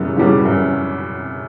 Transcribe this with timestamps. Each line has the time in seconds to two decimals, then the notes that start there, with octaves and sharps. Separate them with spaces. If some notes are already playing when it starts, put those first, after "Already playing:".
Already playing: F#2 C#3 E3 G3 B3
0.16 C#3 E3 G3 B3
0.45 F#2